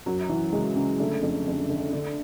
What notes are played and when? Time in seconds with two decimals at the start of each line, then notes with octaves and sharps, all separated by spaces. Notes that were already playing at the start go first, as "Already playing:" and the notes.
0.06 F#2 F#3
0.29 E3
0.52 C#3 G#3
0.76 C#3
1.00 D3 A3
1.22 F2
1.46 F2
1.69 D3
1.93 D3